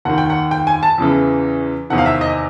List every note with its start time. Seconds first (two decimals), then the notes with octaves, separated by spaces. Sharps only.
0.05 D#2 D#3 F#5
0.18 G5
0.30 F#5
0.51 G5
0.67 G#5
0.83 A5
0.98 E2 C#3 E3
1.90 E2 C3 D#3 F#5
1.98 F5
2.06 E5
2.21 D#5